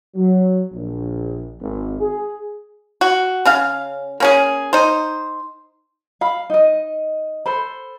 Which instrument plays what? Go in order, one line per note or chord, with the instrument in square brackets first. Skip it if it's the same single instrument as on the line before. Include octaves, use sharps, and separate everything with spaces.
[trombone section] F#3
A#1
G#1
G#4
[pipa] F#4
C#3 C#4 F5
A#3 C#4 G#4
D#4 C5
[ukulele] F5 B5
D#4 D#5
A4 C5 B5